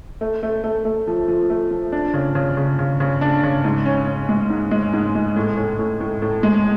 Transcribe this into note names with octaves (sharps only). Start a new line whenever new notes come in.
A3
A3
A3
A3
F3
F3
A3
F3
D4
C#3
C#3
C#3
C#3
C#3
D4
C#3
G#2
C#4
C#4
G#3
G#2
G#3
G#2
G#3
A2
A2
A2
A2
A2
G#3